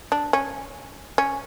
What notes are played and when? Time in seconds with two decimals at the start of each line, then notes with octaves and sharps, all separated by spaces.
0.12 D4
0.33 C#4
1.18 C#4